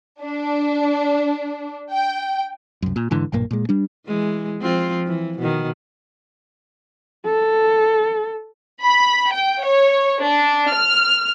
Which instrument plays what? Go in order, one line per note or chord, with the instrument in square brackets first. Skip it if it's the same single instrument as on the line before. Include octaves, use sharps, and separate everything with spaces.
[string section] D4
G5
[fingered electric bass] C2 F#2
A#2
G#2 D3 E3
B1 G2 A#2 A#3
A#2 G#3
G3 D4
[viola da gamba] E3 G#3
F3 C4 F4
E3
B2 D#3
[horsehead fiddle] A4
[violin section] B5
G5
C#5
D4
F6